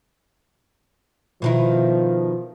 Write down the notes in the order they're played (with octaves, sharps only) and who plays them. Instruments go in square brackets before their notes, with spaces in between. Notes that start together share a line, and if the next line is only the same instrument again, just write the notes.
[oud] B2 D#3 E4 [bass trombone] F3